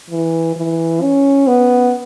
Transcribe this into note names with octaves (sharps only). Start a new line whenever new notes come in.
E3
E3
C#4
B3